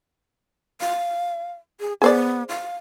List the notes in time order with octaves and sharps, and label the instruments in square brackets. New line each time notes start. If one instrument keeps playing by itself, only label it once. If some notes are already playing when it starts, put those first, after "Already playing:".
[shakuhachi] F5
G#4
[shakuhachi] B3 [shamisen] G#4 C5 D5
[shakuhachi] F5